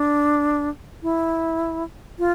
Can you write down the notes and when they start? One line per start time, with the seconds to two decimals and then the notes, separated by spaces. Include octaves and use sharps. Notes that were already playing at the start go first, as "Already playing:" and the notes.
Already playing: D4
1.03 E4
2.19 F4